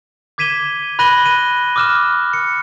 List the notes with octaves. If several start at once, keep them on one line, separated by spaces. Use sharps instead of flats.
D6 G#6 B6 D#7 E7 G7
B5 F#6 A#6 D#7 F#7 G7
D#7
D6 D#6 F6 F#6 E7
C#7